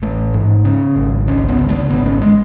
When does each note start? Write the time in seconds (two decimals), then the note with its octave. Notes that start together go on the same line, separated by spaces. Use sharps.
0.02 A1 A3
0.34 G#2
0.65 C#3 C#4
0.96 G#1
1.27 C#2 C#4
1.48 B3
1.59 C#3
1.69 A3
1.90 G#1 B3
2.06 C#4
2.22 G#3